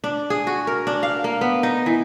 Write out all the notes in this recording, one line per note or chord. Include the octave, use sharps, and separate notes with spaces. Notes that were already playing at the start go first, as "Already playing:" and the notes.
D4
G#4
F#4
A#4
D4
F5
A#3
B3
D#4
E3